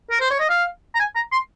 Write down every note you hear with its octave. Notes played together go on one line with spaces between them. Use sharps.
A#4
C5
C#5
D#5
F5
A#5
G#5
A#5
C6